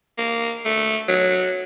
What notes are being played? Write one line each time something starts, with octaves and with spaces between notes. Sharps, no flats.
A#3
A3
F#3